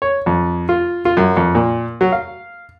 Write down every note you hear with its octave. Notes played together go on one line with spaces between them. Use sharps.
C#5
F2
F4
F4
F#2
F2
A#2
F#3
F5